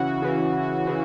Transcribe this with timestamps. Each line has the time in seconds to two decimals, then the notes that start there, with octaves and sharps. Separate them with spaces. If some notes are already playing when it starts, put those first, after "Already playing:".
Already playing: C#3 E3 F#4
0.22 C#3 E3
0.87 C#3 E3